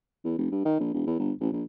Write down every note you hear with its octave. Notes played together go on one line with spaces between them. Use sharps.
E2
F1
G2
D#3
A#1
E1
E2
G1
A1
A#1